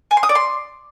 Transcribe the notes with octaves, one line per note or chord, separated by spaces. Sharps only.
G#5
C6
D#6
D5
C6